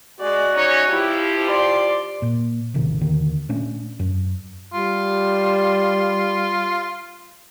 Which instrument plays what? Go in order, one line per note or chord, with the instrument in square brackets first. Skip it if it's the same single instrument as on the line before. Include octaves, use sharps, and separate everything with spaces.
[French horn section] G#3 [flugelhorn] F#4 [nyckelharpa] D5
[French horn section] C#4 D#4 C#5
[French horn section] F3 G4 [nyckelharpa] E4
[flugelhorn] D5 [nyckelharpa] C6
[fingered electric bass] A#2
A1 C3 D#3
D#2 D3 D#3
A#2 A3 C#4 D4
F#2
[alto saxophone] G3 [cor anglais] F4